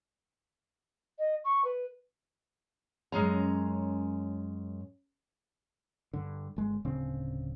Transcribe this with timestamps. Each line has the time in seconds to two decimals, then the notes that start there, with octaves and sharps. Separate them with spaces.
1.18 D#5
1.44 C#6
1.64 B4
3.12 F#2 G#3 C#4 A#5
6.13 G2 D3
6.56 G1 G#3
6.85 D1 C#3 C4 D4